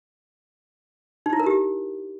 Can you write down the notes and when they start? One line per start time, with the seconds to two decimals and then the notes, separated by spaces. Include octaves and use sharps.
1.26 D#4
1.33 E4
1.40 A#4
1.46 G4